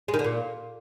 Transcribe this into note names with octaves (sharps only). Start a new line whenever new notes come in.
G#3
D#3
D3
A#2